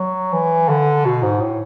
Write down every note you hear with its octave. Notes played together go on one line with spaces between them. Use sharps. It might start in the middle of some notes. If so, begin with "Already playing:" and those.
Already playing: F#3
E3
D3
B2
G#2
A2